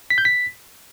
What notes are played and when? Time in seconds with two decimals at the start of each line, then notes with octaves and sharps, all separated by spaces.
0.10 B6
0.18 G6
0.25 B6